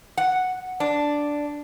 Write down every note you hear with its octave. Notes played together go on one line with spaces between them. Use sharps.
F#5
D4